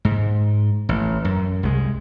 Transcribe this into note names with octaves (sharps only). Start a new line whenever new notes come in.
G#2
A1
F#2
C2 G#3